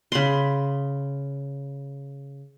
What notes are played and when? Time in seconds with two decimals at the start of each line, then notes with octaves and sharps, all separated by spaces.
0.12 C#3 B5 C6